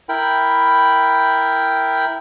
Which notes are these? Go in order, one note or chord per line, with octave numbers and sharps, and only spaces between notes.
E4 A#4 G5 B5